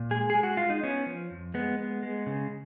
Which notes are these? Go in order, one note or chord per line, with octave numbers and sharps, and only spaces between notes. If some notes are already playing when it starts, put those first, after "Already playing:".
Already playing: A#2
G#3 G#4
G#3 G#4
F#4
G#3 F4
D#4
B3 C#4
F3
F2
G#3 B3
B3
G#3
C#3